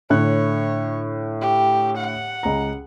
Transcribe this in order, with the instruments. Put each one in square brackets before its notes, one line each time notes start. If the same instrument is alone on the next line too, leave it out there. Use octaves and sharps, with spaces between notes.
[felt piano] A2 D3 F#6 [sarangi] C#5
[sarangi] G4
F#5
[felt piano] C#2 A#5